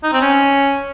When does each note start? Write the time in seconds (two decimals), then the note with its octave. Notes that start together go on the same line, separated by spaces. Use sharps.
0.04 D#4
0.13 C4
0.22 C#4